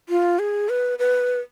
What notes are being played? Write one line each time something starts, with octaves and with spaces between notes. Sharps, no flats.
F4
G#4
B4
B4